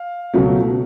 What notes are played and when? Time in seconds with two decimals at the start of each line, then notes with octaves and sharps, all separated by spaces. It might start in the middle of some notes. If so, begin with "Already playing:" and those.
Already playing: F5
0.33 C#2 B2 F#3 A3